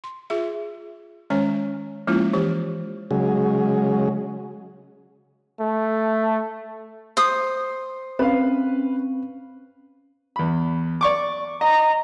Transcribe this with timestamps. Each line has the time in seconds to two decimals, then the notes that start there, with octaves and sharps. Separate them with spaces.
0.04 C6
0.30 F4 G#4 E5
1.30 D#3 G#3 C#4 C#5 G#5
2.07 F3 G#3 A#3 C#4 E4 F4
2.33 E3 G4 C5
3.11 C#3 F#3 G#3
5.60 A3
7.17 C5 D#6
8.19 C4 C#4 B4 F5
10.36 E2 B5
11.01 D5 C#6 D6
11.61 D#5 A#5